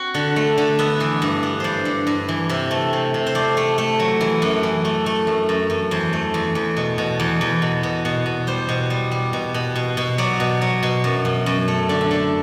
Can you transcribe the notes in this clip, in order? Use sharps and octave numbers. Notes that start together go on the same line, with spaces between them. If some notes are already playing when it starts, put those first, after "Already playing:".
Already playing: C4 F#4
D3
A3
D3
B3 E5
E3
G2
B3
G2 C5 D5
G2
G2
E3
C3 E5
A3
C3
C3
C5
A3 D5
A3
A3
F#3
E3
F#2
E3
A3
A3
F#2
F#2
F#2
E2 C5
A3
E2
E2
B2
B2
E2
E2
B2
B2
B2
B2
G3 C5
B2
G3
G3
B2
B2
B2
B2
F#3 D5
B2
F#3
B2
F#2
F#2
F#2
A3
D3 D5
E5
D3 D5